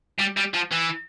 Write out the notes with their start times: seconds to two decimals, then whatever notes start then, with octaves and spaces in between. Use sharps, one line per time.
0.20 G3
0.37 G3
0.54 F3
0.72 E3